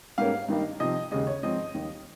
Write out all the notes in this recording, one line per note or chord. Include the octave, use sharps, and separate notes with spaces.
G#2 G3 A#3 C#4 F5
G2 D#3 G3 A#3 D#4
C3 F3 C4 D#4 D#5
D#2 C#3 G#3 D#5
C#5
G#2 F3 C4 D#4 D#5
D#2 D#3 G3